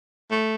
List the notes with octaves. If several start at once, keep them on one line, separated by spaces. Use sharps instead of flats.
A3